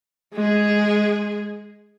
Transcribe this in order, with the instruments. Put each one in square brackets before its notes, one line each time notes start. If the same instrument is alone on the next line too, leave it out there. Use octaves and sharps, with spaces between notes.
[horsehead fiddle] G#3 G#4